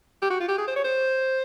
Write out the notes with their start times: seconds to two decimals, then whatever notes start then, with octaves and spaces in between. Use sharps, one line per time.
0.22 G4
0.30 F#4
0.40 F4
0.48 G4
0.58 G#4
0.68 C5
0.76 C#5
0.84 C5